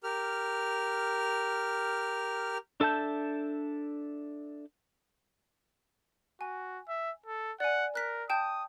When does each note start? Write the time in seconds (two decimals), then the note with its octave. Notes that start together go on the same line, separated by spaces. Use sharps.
0.03 G4 A#4 F6
2.80 D4 A4 E5 A5 G6
6.41 F#4 G#5
6.88 E5
7.26 A4
7.60 D5 F#5 G#5
7.95 A#4 F#6 B6
8.30 G5 A5 D#6 G6